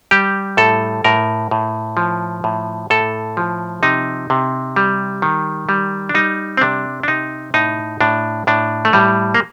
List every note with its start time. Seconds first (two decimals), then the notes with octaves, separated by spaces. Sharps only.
0.11 G3 G4
0.57 A2 A4
1.04 A2 A#4
1.51 A2
1.97 F3
2.44 A2
2.90 A2 A4
3.37 F3
3.83 C3 D#4
4.30 C3
4.76 G3
5.22 D#3
5.69 G3
6.09 D4
6.14 G3 D#4
6.57 C4
6.61 C3 D4
7.03 D4
7.08 C3 D#4
7.54 A2 D#4
8.01 A2 D4
8.47 A2 D4
8.85 A3
8.93 A2 G3
9.34 A#3